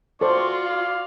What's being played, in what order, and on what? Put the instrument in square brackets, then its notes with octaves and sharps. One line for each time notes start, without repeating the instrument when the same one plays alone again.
[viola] F4 F#4 [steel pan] A4 C5 [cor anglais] D5 [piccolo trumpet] C#6
[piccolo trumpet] F5